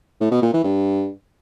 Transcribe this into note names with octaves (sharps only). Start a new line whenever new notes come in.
A2
B2
A#2
E3
G2